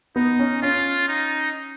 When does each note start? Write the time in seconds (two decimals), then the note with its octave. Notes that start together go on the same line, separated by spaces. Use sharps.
0.16 B3 D#4
0.39 C#4
0.62 C#4 F4
1.08 D#4